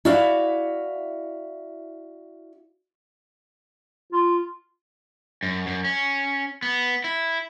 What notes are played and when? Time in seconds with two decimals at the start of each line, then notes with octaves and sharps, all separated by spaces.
0.05 E4 F#4 D5 E5 F5
4.13 F4
5.43 F#2
5.67 F#2
5.85 C#4
6.62 B3
7.04 E4